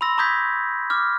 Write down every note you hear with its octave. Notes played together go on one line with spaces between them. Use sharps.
B5 C6 E6 A#6
A#5 C#6 D#6 G6 G#6 B6
D6 F6